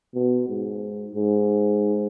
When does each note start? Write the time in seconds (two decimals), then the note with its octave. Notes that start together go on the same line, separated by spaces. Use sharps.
0.15 B2
0.48 G#2
1.14 G#2